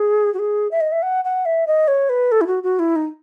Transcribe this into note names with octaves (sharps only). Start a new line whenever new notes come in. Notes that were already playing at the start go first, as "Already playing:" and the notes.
Already playing: G#4
F#4
G#4
E5
D#5
E5
F#5
F#5
E5
D#5
C#5
B4
A4
E4
F#4
F#4
E4
D#4